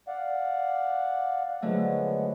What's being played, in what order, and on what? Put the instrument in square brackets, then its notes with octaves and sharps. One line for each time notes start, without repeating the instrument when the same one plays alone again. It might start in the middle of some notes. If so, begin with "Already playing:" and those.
[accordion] D5 F5 F#5
[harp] D3 F#3 A3 [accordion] F3 G#3 B3